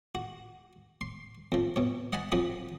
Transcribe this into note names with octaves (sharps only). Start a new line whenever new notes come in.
F#4
C6
F2 F3
B2 C#5
D#5 F#5 G#5 A5 B5
F2 F3 F#3 B5 D#6